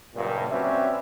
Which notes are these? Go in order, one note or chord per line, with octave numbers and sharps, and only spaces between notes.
F#1 G2 A#2
C4 C#4 F#4 B4 D5 E5